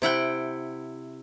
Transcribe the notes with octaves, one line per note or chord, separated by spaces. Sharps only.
C3 E4 F#5 G5